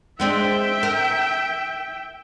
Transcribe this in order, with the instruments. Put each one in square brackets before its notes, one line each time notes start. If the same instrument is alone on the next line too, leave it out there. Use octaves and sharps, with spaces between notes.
[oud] G#3 C4 D4 [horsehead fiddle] E5 G5
[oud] A#4